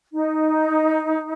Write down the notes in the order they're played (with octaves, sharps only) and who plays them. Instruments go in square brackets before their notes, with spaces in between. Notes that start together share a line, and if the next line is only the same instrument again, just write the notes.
[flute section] D#4